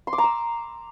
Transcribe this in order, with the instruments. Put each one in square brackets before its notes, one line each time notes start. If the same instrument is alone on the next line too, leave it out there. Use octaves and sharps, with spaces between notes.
[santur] C6
D6
A#5
E6